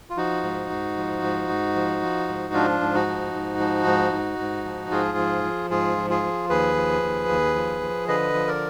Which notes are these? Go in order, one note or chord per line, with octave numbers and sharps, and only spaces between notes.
F4
F3 D#4 F#4
G#2
G#2
F3
G#2
G#2
F3
F3
G#2
F3 D4 F4
G#2
D#4 F#4
F3
G#2
F3
G#2
G#2
G#2
F3
G#2 F4 G#4
F3
F3
G#2 F4 G#4
F3
F4 G#4
F3
D#2 G#4 B4
F3
D#2
D#2
F3
F3
D3 B4 D#5
F3
A#4 D5